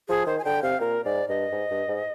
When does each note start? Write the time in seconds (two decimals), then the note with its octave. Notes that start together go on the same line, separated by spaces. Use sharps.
0.09 F3 G#4
0.26 D#3 C5
0.39 G#5
0.45 D3 G5
0.63 C3 F5
0.81 A#2 A#4
1.04 G#2 D5
1.29 G2 D#5
1.52 G#2
1.70 G2
1.89 G#2